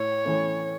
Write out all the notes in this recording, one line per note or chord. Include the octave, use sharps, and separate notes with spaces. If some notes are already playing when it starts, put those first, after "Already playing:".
Already playing: A2 C#5
E3 A3 C#4